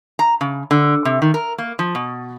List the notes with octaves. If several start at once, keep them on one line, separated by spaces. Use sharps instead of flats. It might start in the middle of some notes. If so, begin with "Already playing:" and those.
A#5
C#3
D3
C3
D#3
A#4
A#3
F3
B2